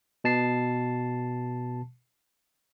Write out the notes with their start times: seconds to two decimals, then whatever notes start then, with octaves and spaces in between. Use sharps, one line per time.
0.24 B2 A5 C7